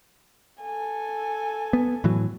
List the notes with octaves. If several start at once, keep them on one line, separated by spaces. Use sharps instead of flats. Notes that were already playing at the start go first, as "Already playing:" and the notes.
A4 G#5
B3
A2 E3 F#3